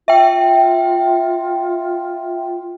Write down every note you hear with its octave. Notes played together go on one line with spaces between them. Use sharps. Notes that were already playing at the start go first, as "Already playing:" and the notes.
F4 E5 G5